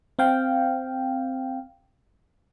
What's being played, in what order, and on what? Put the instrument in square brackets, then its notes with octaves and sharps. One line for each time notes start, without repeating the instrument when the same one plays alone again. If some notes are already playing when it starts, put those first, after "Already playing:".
[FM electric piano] C4 F5 G5